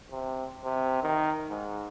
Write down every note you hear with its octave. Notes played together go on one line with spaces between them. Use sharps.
C3
C3
D#3
G#2